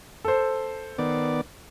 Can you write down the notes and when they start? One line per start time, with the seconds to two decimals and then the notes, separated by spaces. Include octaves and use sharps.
0.24 A4 C5
0.98 D#3 B3 D5